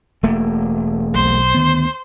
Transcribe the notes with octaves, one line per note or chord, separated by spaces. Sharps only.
E1 A3 A#3
B1 C5
D2 D#3 B3